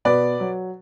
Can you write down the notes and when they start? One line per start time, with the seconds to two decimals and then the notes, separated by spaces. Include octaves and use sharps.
0.05 B2 B4 D5
0.40 F#3